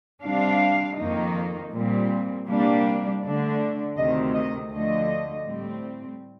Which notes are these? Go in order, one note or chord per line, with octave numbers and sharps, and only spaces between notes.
C3 G3 D4 F5
F2 D#3 A#3 D#4
A#2 G3 C4
C3 G3 A#3 D4
D3 A3 D4
D2 C3 D#3 D#5
D#5
D2 D3 F3 A3 D#5
A2 G3 C4